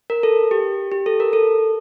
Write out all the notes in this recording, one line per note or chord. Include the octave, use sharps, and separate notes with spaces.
A#4
A4
G4
G4
A4
A#4
A4